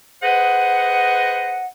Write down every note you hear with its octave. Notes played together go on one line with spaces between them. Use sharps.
G#4 B4 C5 D#5 F#5